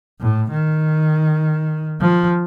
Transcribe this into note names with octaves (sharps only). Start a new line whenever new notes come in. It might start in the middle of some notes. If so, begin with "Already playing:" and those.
A2
D#3
F3